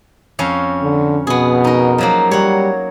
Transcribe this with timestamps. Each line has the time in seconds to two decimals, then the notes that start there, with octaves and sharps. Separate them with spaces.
0.39 F2 C#4 F5
0.83 D3
1.27 B2 B3 G#4
1.64 D#4 A#4
1.98 F3 F#3 A#3
2.31 G3 C#5 F#5